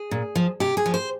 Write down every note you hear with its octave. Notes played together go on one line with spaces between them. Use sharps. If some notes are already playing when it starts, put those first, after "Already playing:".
Already playing: G#4
A#2
F3
C3 G4
G#4
F3
C5